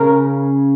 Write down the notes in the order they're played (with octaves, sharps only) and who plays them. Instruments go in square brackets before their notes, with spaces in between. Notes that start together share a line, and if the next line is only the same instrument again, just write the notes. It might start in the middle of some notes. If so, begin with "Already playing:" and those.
Already playing: [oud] C#3 [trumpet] A#4